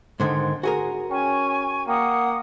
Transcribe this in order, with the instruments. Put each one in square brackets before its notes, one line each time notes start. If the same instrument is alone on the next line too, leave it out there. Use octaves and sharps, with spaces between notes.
[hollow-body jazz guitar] G#2 D3 D#3 [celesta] C5 C6 G#6
[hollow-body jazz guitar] F#4 G#4 A#4 [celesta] G#5
[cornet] C#4 [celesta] G5 [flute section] G#5 C#6
[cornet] A#3 [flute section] F#5 D#6 [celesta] G5 C#7